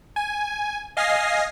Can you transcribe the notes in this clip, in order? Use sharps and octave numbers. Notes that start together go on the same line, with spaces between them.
G#5
D#5 F5 G#5 A#6 C7